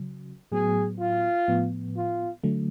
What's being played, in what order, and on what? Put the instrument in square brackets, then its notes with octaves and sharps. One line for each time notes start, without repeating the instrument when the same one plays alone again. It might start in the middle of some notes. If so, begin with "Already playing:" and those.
Already playing: [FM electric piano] C#3 F#3
[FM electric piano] A2 F#3 B3 [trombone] G#4
[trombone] F4
[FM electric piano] A2 F3 B3
[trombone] F4
[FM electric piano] D3 F#3 A3